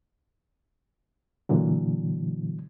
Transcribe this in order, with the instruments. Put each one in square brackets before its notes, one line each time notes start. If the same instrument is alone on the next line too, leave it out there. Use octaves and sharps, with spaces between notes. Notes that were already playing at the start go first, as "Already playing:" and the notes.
[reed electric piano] A#2 D3 E3 F#3